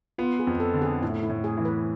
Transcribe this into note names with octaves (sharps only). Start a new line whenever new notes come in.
B3 F4
G#4
F2
A4
D3
G#4
A2 E4
E4
A2
G#4
E3
B4